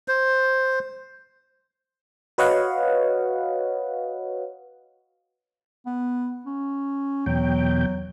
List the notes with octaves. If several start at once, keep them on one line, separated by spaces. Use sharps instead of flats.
C5
F#4 B4 C#5 D#5 F5 F#5
B3
C#4
E2 B2 F#3 G5